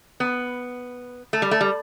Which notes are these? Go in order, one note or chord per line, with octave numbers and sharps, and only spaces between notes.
B3
A3
G3
A3
G3